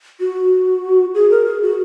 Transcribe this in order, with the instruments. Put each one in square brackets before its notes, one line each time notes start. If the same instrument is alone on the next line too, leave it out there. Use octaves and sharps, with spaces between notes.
[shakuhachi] F#4
G#4
A#4
G#4
F#4